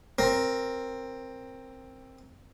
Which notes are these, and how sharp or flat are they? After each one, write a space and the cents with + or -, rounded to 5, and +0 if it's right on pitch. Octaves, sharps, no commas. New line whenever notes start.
C4 +10 A#4 +5